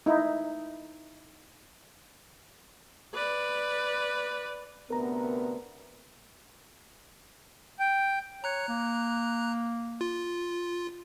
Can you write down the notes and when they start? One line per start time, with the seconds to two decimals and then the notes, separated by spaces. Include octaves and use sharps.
0.06 D#4 E4
3.14 B4 D5
4.90 D2 C3 B3 A#4 A#5
7.79 G5
8.44 C#5 A#5 F#6
8.68 A#3
10.01 F4